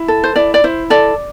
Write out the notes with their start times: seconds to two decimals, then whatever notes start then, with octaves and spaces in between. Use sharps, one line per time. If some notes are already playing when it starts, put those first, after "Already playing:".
Already playing: E4
0.08 A4
0.24 C5
0.36 E4 D5
0.54 D5
0.64 E4 C5
0.90 A4 D5